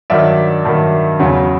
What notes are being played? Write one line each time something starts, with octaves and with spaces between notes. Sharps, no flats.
G2 D#3 F#3 D5 E5
G2 D#3 F#3
E2 C#3 F#3